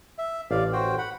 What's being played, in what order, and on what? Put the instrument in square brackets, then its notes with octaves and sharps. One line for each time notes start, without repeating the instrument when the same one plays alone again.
[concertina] E5
[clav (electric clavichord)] A1 [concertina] D5 F5
[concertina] F#4 C5 G5
F#5 B5